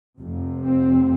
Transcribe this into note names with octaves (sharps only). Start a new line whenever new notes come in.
F1 F2 C3
C4